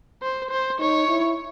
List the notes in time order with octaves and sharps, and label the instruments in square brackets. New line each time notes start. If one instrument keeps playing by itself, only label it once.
[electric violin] C5
C5
[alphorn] D#4 [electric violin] C#5
[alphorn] E4